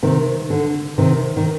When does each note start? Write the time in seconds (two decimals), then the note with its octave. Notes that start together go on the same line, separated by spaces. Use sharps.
0.03 C3 D#3
0.50 D3
0.98 C3 D#3
1.37 D#3